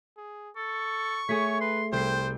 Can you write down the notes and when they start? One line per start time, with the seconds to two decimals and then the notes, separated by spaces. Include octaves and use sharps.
0.17 G#4
0.56 A4 C#6
1.29 A3 G#4 C#5 B6
1.61 B4 C6
1.92 C2 C5 G5 C7